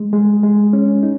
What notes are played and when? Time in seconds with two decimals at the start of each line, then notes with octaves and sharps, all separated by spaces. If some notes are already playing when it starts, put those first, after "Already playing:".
Already playing: G#3
0.13 G#3
0.43 G#3
0.73 C#4
1.03 D#4